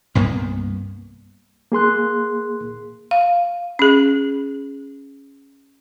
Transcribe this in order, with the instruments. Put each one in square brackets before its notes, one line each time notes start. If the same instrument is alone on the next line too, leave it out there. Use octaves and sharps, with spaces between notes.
[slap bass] C2 G2 A#3 B3
[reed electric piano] A#3 G#4 C6 F#6
[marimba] F5
C#4 G#4